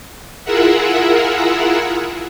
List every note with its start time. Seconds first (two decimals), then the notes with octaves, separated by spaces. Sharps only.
0.44 E4 F4 G#4 A#4 E5 F#5